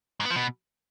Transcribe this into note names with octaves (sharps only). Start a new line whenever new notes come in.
G#2
B3
F3
B2